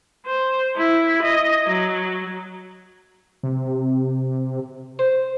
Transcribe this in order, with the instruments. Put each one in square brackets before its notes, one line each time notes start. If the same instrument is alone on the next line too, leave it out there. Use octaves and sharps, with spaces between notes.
[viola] C5
E4
D#5
F#3
[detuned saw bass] C3
[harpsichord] C5